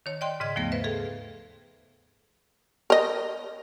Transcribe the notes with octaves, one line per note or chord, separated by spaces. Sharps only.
D#3 C#5
D5 D#5 G5 C6
G#2 C#3 D#5 G#6
D#2 F3 A3 B3 A#6
B4 C5 E5
G#4 A4 F5
A#4 D#5